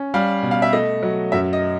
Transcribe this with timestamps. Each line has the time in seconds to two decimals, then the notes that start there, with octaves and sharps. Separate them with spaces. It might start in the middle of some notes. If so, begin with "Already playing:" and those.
Already playing: C#4
0.14 G3 F5
0.43 B2
0.51 F5
0.62 E5
0.73 A3 D#5
1.03 F#3
1.32 F#2 E5
1.53 D#5